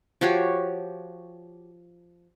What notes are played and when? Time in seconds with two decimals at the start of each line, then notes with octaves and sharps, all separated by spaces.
0.21 F3 F#4 G4 C#5